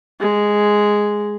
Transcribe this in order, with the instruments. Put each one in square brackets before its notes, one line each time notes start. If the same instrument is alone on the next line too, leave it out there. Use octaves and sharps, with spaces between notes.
[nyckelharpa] G#3